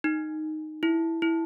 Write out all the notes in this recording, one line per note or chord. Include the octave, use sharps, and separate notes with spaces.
D#4
E4
E4